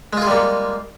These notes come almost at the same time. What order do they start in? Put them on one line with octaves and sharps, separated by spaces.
G#3 F4 G#4 G3 A#3